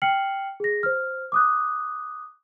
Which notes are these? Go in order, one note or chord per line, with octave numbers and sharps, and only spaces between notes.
G5 F6 C7 C#7 F#7
G#4 A#6
C5 F6
D6 D#6 F#6